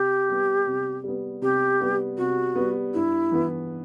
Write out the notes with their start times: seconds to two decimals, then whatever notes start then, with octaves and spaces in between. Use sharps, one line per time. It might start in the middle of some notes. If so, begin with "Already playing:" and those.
Already playing: C3 G4
0.29 G3 B3
0.67 C3
1.04 G3 B3
1.42 C3 G4
1.80 G3 B3
2.18 C3 F#4
2.55 G3 B3
2.94 G2 E4
3.32 E3 B3